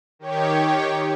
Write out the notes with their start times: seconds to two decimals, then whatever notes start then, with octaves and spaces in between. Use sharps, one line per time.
0.19 D#3 G4 C#5